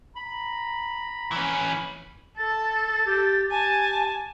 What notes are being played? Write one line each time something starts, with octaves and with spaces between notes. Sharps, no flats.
A#5 B5
E3 C#4
A4 A6
G4
G4 G#5 A5